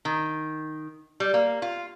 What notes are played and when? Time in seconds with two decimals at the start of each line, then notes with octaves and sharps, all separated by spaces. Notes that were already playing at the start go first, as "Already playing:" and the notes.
0.05 D#3
1.20 G3
1.34 A#3
1.62 F4